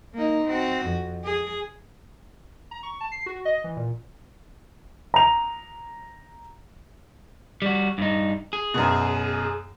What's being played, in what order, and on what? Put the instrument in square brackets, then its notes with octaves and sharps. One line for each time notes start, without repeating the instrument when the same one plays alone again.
[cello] A#3 D#4
C4 F#4
F2
G#4
[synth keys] A#5
C#6
A5
C7
F#4
D#5
E3
A#2
[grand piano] A#5 F7
[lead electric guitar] G3 F#4
G2 D#4
G#4
[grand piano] F#2 B2